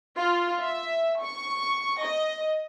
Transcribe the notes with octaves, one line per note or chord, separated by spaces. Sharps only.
F4
E5
C#6
D#5